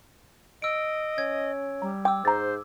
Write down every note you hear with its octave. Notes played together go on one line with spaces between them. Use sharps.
D#5 E6 D7
C#4 G#6
G3 A#5
G5 D6 E6
G#2 C5 A#5 A6